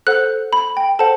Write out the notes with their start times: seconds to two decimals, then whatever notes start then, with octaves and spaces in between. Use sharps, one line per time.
0.07 A4 C5 F#5 F#6
0.53 B5
0.77 G5
0.99 A4 C5 F#5 A5